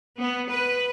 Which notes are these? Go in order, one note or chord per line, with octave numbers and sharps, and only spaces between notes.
B3
B4